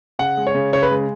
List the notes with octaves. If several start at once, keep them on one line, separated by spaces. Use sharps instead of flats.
C#3 F#5
G#3
C#5
C#3
C#3 C#5
B4
G#3